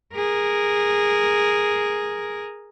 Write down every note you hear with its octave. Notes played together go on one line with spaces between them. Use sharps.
G#4 A#4